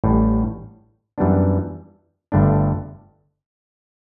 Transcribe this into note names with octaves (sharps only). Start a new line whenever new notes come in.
A1 A2 G3
F#2 E3 G3 B3 D4
G1 G2 D3 A3 D4